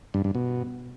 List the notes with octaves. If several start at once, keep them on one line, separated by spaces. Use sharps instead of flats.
G2
G2
B2